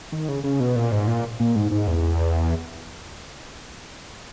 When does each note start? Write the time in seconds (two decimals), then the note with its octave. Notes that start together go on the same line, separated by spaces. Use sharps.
0.12 D#3
0.28 C#3
0.44 C#3
0.60 B2
0.76 A#2
0.92 G#2
1.07 A#2
1.40 A#2
1.56 G#2
1.71 G#2
1.87 E2